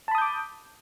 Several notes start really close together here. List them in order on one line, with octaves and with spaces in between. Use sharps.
A5 B5 D#6 G6 D6